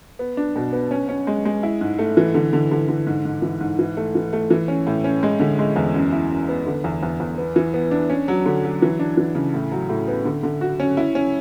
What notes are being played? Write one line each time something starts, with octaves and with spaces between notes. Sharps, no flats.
B3
D4
B2
B3
C#4
C#4
G#3
G#3
E4
G#2
A3
E3
D3
D3
D3
D3
G#2
G#2
E3
G#2
E3
A3
E3
A3
E3
C#4
A2
C#4
G#3
D3
G#3
E2
F#2
E4
F#2
B3
D3
E2
E2
E2
B3
E3
B3
D4
C#4
F#3
D3
F#3
E3
D4
E3
C#3
A2
F#3
A2
B3
D3
D3
F#4
C#4
E4
C#4